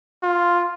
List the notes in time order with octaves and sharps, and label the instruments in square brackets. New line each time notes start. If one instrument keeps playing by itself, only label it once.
[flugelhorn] F4